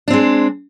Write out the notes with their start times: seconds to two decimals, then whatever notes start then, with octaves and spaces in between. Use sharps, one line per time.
0.08 D4
0.10 C4
0.13 G#3